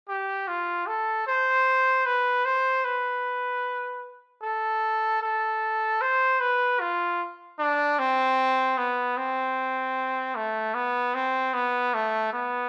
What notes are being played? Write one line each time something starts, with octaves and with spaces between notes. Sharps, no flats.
G4
F4
A4
C5
B4
C5
B4
A4
A4
C5
B4
F4
D4
C4
B3
C4
A3
B3
C4
B3
A3
B3